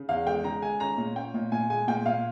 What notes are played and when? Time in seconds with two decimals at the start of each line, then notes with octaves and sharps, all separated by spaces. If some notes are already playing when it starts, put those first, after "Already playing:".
Already playing: C#3
0.09 E2 F5
0.27 G#3 G5
0.44 C#3 A#5
0.62 G#3 G#5
0.80 C#4 A#5
0.98 A#2
1.16 C#4 G5
1.34 A#2
1.52 A#2 G#5
1.70 G#3 G#5
1.88 A#2 G5
2.06 A#2 F5